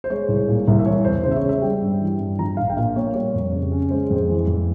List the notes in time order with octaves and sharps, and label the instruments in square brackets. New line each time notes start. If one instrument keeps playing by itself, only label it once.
[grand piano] C5
G#3 C#5
C2
A#2
C2
E5
E3 C#5
E2 C5
C#3 C5
E5
C#5
G#3
E5
G3 G5
G2
E3
G2
F3 A#5
A#1 F5
G5
A#2 F5
A#3 C#5
G3 C#5
F2
C#3
C#4
G#3 C5
F2 C5
E3
F2